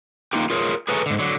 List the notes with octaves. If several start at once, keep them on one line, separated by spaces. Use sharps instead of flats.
A#3 D#4 F4 G4
F4 G#4 A#4 C#5
G#4 A4 B4 C#5 G#5 A#5
G#2 D3
D3 F#3